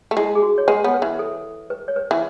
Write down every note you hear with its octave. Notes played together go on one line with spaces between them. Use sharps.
A3
G#3 E4
G#4
F#4
C#5
G#3 B4
B3 C#5
B4
E3
A4
B4
C#5
B4
E3